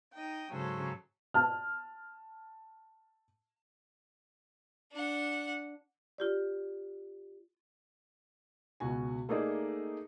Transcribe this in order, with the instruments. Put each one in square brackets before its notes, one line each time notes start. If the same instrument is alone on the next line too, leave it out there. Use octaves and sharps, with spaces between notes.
[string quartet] D#4 D#5 G5
G#2 C#3 F#3 A4 C5
[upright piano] A5 F6
[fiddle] D4 F#5
[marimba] F4 G4 D5
[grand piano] C#2 B2 F#4 G#5
A3 A#3 D#4 G#4 D5 D#5